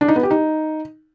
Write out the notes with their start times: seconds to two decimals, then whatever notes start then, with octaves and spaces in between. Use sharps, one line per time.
0.01 D4
0.08 D#4
0.16 B3
0.23 G4
0.31 D#4